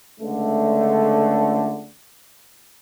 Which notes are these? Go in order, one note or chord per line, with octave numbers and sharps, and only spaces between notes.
C#2 D3 A3